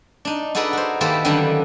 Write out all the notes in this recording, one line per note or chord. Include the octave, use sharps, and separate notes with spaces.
D4 D#4
D#4 F#4 G#4 A4 B4 D5
F#4 C5
D#3 A#3 G4 A4 B4 C5
D3 D#3 F#3 G3 C#4 D4